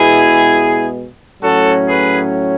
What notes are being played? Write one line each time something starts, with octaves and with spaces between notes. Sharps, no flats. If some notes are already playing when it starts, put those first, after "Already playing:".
Already playing: B2 G#3 B3 E4 G#4
A2 F#3 C#4 F#4 A4
G#4 B4